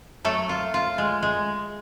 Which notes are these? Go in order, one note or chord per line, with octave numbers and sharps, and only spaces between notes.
F#3 A3 A4
F4
F4
G#3
G#3